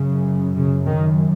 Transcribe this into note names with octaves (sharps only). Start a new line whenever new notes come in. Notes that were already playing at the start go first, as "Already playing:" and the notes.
Already playing: F#2 C#3
C#3
D#3